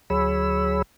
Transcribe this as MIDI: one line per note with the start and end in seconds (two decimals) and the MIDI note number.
0.10 0.82 38
0.10 0.82 54
0.10 0.82 68
0.10 0.82 73
0.10 0.82 83
0.10 0.82 88